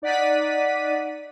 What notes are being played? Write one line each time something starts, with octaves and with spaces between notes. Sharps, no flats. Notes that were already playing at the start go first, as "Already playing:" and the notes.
D#4 D5 F#5 B6 D#7